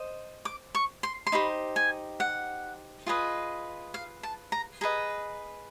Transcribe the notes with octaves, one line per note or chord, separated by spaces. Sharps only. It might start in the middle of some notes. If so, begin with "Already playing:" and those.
Already playing: C5 D#5
D6
C#6
C6
C6
D#4 G4 C5 B5
G#5
F#5
F4 G#4 B4 D#5
F5
A5
A#5
G#4 B4 D#5 A#5